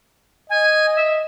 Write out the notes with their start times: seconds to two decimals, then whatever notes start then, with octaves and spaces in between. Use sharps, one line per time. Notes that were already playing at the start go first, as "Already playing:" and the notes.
0.50 D#5 G#5
0.96 E5